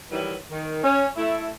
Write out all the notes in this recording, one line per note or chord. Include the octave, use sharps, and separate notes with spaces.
D#3 E3 F#3 G3 E4 B4
D#3
C#4
A3 E4